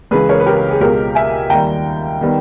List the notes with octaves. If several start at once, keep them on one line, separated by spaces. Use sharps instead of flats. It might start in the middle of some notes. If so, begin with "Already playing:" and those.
C#2 C#3 E3 G#4 B4
A#4 C#5
B4
G4 A#4
G#4
C#2 B2 G#3 G4 A#4
E5 G#5
D#2 D#3 G3 G5 A#5
D#3 G3 B3